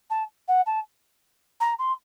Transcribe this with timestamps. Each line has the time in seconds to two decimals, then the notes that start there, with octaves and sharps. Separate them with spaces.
0.10 A5
0.48 F#5
0.66 A5
1.60 A#5
1.78 C6